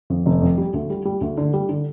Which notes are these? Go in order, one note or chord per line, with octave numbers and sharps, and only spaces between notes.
F2
F1
F2
G3
D2
G3
G3
D2
D3
G3
D3